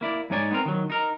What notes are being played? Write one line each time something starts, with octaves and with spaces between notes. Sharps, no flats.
A#3 E4 D5
G#2 G#3 D#4 C#5 D5 G#5
B3 C4 A#4
D#3 F#3
D#4 A#4